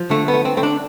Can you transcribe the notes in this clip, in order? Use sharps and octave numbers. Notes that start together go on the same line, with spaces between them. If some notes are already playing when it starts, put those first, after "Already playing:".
Already playing: F3
D3 A3
B3
A3
C4
A3 C4
D4